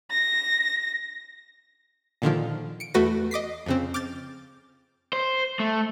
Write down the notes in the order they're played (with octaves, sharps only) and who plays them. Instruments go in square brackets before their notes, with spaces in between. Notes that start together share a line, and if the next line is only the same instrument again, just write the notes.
[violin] A#6
[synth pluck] A#2 D3 D#3 F3
C#7 D7
E2 A3 F#4 B4 A#6
D#5 D6 B6 C7
F2 C#3 C4
D6 F6 G6 A6
[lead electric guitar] C5
A3